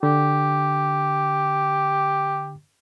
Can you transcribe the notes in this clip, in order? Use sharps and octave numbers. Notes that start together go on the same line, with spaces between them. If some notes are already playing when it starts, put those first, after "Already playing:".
D3 G4